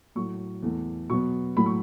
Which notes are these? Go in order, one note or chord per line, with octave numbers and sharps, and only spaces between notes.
A2 F#3 A3 C#6
E2 E3 A3
B2 F#3 B3 C#6
A2 F#3 A3 B5
C#6